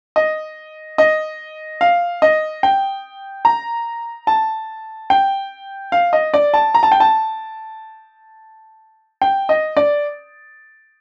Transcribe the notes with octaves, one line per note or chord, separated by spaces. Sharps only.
D#5
D#5
F5
D#5
G5
A#5
A5
G5
F5
D#5
D5
A5
A#5
A5
G5
A5
G5
D#5
D5